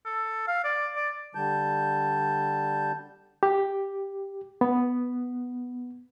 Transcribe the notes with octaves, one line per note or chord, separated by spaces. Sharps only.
A4
F5
D5
D5
D3 G3 A5 G6
G4
B3